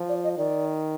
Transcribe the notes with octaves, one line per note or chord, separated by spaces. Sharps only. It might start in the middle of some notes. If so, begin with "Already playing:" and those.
Already playing: F3
D5
D#5
D#3 D5